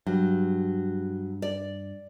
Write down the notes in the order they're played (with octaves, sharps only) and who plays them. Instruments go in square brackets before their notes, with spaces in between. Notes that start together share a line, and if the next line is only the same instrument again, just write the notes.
[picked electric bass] G2 [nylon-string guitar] F#3
[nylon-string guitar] D5